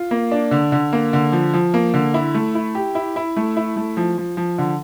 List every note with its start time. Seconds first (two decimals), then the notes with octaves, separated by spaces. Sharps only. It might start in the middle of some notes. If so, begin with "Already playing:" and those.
Already playing: F4
0.11 A#3
0.32 D4
0.51 D3
0.72 D3
0.93 A#3
1.13 D3
1.32 F3
1.54 F3
1.74 A#3
1.94 D3
2.14 E4
2.34 A3
2.55 E4
2.75 G4
2.95 E4
3.16 E4
3.37 A3
3.57 E4
3.76 A3
3.97 F3
4.18 F3
4.37 F3
4.58 D3